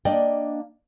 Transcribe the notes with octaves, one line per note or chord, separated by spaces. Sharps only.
A#3 D4 D5 D#5 G5